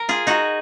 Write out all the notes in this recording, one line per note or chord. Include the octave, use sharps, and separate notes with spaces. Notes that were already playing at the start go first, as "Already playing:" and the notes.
Already playing: A#4
F4 G#4
D#4 F#4